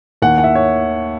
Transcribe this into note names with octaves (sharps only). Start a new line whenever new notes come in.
D#2 F#5
F#5
E5
C#5